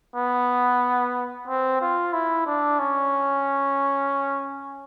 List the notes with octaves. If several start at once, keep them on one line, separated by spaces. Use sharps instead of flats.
B3
C4
F4
E4
D4
C#4